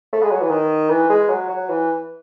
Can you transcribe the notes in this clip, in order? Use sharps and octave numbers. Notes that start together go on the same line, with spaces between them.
A3
G#3
F#3
E3
D#3
E3
G#3
F#3
F#3
E3